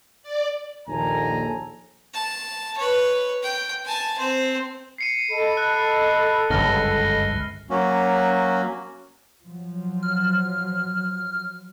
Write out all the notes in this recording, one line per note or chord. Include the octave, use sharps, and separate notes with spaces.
D5
A#1 D#2 A4 G#5 A#5
A5
B4 C#5
G5
G#5 A5
C4 C5
C7 C#7 D#7
A4 D#5 B5
F#6
G1 C#2 F#2 F6 A#6 G7
F#3 A#3 C#4 F#4
F3 F#3
F6